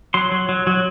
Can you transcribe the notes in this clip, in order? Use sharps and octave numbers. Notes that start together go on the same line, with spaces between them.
F#3 C6
F#3
F#3
F#3